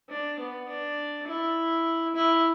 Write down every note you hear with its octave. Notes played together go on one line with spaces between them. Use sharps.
D4
B3
D4
E4
E4